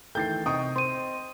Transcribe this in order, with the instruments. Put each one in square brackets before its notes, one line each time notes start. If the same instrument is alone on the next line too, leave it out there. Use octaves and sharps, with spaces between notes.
[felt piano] D#3 E3 A3 [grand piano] G5 A6 C7 [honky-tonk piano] G6
[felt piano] C3 [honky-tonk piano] D#4 G5 C#6 [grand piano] D#6
[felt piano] C4 [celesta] C6 D#7